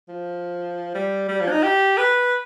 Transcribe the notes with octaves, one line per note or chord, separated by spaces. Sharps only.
F3
G3
G3
F3
D4
D#4
G4
B4